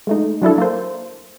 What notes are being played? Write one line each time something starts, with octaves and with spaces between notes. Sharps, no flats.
G#3 A3 D#4
F#3 D4 E4 A4
A#3 C5